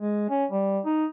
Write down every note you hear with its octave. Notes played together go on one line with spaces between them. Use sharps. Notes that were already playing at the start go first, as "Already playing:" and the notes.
G#3
C#4
G3
D#4